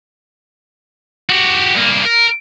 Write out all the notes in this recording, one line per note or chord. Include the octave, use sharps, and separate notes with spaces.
F#4 G4
G2 A#3
A#4